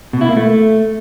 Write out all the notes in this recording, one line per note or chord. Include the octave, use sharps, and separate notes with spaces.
B2
E4
A#3
A3